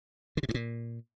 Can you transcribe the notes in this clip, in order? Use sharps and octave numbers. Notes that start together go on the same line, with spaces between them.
D3
C3
G2
A#2